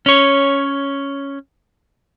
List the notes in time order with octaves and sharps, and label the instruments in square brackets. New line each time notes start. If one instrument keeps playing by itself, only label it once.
[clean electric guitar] C#4 C#5